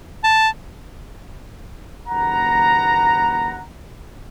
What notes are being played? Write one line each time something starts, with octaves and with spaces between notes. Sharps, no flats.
A5
F#1 D#2 B4 F#5 A#5